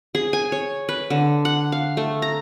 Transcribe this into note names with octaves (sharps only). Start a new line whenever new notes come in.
G#4
G#5
C#5
B4
D3
F#5
F5
A3
A#5